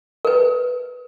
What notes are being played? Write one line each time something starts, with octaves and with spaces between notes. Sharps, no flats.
A#4 B4